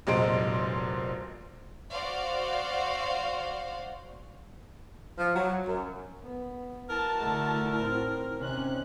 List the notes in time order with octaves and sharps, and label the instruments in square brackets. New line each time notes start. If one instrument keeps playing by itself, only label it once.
[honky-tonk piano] F1 A#2 F#3 G#3 C5 D7
[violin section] F#4 C5 D5 F5
[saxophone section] F3
F#3
F#2
[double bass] B3
[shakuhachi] E4 [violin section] F#4 A5 [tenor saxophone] A#4
[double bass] D3 A3
A2 C4
[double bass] C3 D#3 [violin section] C4 C#4 F#6